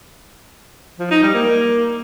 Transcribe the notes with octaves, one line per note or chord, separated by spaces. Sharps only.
F3
D#4
G3
A#3